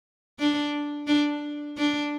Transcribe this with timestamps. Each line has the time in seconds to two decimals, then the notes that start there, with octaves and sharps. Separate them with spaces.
0.39 D4
1.07 D4
1.78 D4